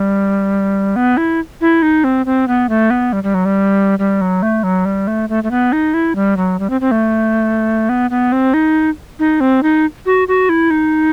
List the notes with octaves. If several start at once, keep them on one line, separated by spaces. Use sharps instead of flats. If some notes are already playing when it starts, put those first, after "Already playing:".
Already playing: G3
B3
E4
E4
D#4
C4
C4
B3
A3
B3
G3
G3
F#3
G3
G3
F#3
A3
F#3
G3
A3
A3
A3
B3
D#4
E4
G3
F#3
G3
C4
C4
A3
B3
B3
C4
D#4
D#4
C4
D#4
F#4
F#4
E4
D#4